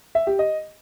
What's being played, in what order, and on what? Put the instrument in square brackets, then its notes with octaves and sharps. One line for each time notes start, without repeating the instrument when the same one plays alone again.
[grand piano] E5
G4
D#5